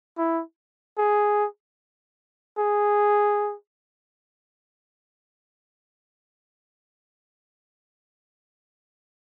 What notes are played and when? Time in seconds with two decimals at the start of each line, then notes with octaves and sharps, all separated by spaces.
0.18 E4
0.98 G#4
2.58 G#4